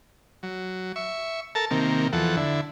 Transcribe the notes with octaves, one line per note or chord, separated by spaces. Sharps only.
F#3
E5 C#6
A4 A#4 A5
C3 D#3 A#3
E2 F3 A4 F#5
D3 E4